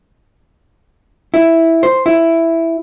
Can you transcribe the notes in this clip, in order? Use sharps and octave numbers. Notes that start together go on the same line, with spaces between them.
E4
C5
E4